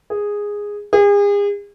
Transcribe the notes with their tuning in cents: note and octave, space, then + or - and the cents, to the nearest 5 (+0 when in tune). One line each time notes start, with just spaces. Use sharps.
G#4 -10
G#4 -40